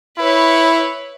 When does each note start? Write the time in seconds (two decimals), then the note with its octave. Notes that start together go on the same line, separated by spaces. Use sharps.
0.18 E4 B4 C#5